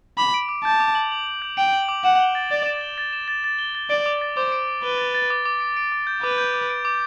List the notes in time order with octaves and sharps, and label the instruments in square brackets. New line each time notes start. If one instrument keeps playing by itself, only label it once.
[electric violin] B5 [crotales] D6
[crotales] D7
D6
[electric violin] A5 [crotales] G6
[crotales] D6
F#7
F#7
F#7
G6
[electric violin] G5 [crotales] D7
[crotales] F#7
D6
[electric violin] F#5 [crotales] E7
[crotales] G7
A6
[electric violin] D5 [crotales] A6
[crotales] E7
G7
A6
E7
A6
A6
G7
A6
[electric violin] D5 [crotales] D7
[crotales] D6
A6
[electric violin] C5 [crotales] D6
[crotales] D7
D7
[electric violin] B4 [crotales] G7
[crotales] A6
A6
D6
D6
D7
D7
D6
G6
[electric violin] B4 [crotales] D6
[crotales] G6
D6
D7
D6